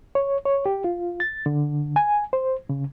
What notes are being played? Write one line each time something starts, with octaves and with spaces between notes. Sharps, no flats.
C#5
C#5
G4
F4
A6
D3
G#5
C5
C#3